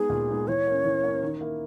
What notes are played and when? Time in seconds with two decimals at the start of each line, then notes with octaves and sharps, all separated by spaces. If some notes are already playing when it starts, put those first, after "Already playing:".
Already playing: G#3 B3 D#4 G#4
0.10 A#2
0.29 G#3 B3 D#4
0.48 E3 C#5
0.67 A#3 C#4
0.84 E3
1.04 A#3 C#4
1.23 D#3
1.41 A#3 E4